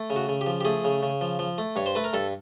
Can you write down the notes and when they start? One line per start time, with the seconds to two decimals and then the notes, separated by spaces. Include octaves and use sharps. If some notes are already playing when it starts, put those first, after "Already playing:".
Already playing: A3
0.10 C#3
0.16 F#4
0.29 C#3
0.41 G4
0.46 F3
0.61 G4
0.65 A3 G#4
0.84 C#3
1.03 C#3
1.21 F3
1.39 F3
1.58 A3
1.76 G2 C#5
1.86 C5
1.95 A3 B4
2.04 A#4
2.13 G2 A4